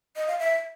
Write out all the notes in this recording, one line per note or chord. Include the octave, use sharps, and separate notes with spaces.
D#5
F5
E5